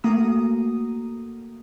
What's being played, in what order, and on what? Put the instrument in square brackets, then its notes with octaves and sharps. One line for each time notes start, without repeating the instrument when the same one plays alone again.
[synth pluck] A3 A#3 F#4 A#5 D#6